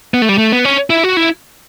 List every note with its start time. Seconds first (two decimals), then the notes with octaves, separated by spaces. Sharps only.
0.14 B3
0.22 A3
0.29 G3
0.38 A3
0.52 B3
0.65 C#4
0.90 E4
1.04 F#4
1.17 E4